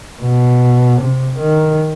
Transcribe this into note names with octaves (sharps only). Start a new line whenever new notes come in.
B2
C3
D#3